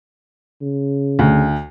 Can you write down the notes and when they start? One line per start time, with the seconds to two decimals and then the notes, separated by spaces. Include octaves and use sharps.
0.62 C#3
1.19 D2